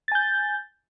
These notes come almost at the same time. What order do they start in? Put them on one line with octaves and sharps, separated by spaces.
A6 G#5 G6